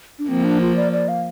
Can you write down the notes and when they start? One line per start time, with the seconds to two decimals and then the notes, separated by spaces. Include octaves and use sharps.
0.19 D4
0.28 F3 A#3 C4
0.44 D4
0.61 F4
0.76 D5
0.92 D5
1.08 F5